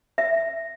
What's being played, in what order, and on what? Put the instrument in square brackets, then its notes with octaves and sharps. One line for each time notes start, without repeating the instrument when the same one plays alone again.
[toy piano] E5